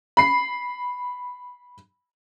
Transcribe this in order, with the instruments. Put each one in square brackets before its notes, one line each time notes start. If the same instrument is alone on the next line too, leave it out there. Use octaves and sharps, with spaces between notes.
[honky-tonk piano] B5 C7